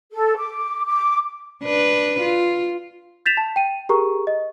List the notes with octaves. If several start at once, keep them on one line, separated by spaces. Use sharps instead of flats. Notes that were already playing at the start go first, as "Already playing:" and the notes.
A4
D6
D6
D4 B4
F4
G6 A6 B6 E7 F7
A5
G5 D#7
G4 G#4 A#4 A#5 C#6
D#5